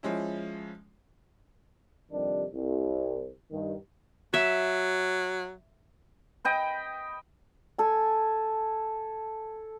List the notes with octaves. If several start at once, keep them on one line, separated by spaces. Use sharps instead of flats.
F3 G#3 C#4 E4
F2 C3 D#3 G3 D4
C2
G2 D#3
F#3 E5
D#5 G5 B5
A4 G#5